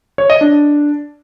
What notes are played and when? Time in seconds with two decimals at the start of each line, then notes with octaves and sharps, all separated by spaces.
0.18 C#5
0.30 D#5
0.41 D4